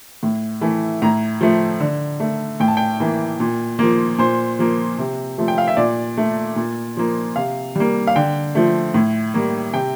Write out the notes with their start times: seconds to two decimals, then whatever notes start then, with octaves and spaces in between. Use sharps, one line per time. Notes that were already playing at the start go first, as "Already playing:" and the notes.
0.23 A2
0.61 E3 A3
1.02 A2 A#5
1.41 F3 A3
1.80 D3
2.20 A3
2.60 A2 G5
2.68 A5
2.77 G5
3.00 E3 A#3
3.40 A#2
3.79 F3 A#3
4.18 A#2 C5
4.59 F3 A#3
4.99 C3
5.38 F3 A3
5.48 G5
5.58 F5
5.68 E5
5.77 A#2 D5
6.18 A3
6.56 A#2
6.97 F3 A#3
7.36 C3 F5
7.76 G3 A#3
8.07 F5
8.16 D3 G5
8.55 F3 A3
8.94 A2
9.34 G3 A#3
9.74 C3 G5